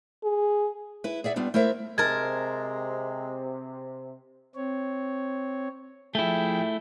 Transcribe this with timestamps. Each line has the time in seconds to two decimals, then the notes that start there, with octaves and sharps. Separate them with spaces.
0.24 G#4
1.04 E4 B4
1.24 G#4 D5 E5 F#5
1.36 G3 B3 D4 F4
1.54 A3 E4 A#4 C5 E5
1.98 C3 G#3 A#4 A5 G#6
4.55 C4 C#5
6.15 F3 A3 E4 G#4 G5